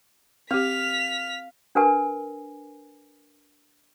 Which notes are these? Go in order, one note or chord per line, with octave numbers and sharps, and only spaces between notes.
C4 G4 F5 B6 F7
D4 A#4 B4 G#5